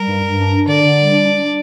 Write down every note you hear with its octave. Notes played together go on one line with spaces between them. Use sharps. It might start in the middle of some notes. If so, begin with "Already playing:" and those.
Already playing: G3 A#4
G2
G2
D4
D4
D3 D5
D3
G3
D4
D4
D4